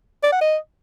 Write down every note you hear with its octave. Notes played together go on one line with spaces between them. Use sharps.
D5
F#5
D#5